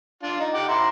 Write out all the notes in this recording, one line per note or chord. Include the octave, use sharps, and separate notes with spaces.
D4 F4
D#4
F#5 G5 D6
E4 A#5 C6